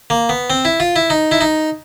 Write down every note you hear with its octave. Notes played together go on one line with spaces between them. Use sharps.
A#3
B3
C4
E4
F4
E4
D#4
E4
D#4